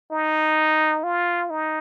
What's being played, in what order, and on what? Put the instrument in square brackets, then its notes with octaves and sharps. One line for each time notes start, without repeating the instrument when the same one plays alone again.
[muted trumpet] D#4
F4
D#4